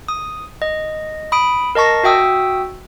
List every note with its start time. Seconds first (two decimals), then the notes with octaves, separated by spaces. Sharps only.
0.08 D#6
0.62 D#5
1.32 B5 D#6 D7
1.75 A#4 D#5 A5 C#6 A#6
2.04 F#4 E5 G5 D#6 E6